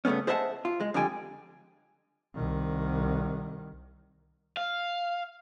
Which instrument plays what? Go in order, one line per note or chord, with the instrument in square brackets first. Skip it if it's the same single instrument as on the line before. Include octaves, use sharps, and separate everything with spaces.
[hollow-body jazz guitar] G2 C#3 A3 B3 C#4
G#4 C5 D#5 E5 F#5 A5
F4
G#3
F2 D3 G3 G5 G#5
[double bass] C2 D#3
[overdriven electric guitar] F5